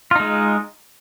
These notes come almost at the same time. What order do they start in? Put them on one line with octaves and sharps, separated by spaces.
F4 D#4 G#3